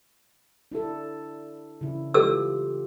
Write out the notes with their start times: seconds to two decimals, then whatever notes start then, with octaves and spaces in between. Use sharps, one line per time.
0.72 D4 E4 A4
1.81 C#3 E3 E4
2.14 E3 F4 G4 A4 E6